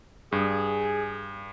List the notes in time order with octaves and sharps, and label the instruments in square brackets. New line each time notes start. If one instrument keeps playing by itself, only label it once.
[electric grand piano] G2 [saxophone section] G#4